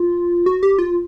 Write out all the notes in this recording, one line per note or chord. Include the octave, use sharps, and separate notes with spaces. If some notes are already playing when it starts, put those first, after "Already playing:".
Already playing: F4
F#4
G4
F4